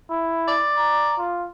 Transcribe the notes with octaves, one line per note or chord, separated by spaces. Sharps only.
E4
D5
A#5
F4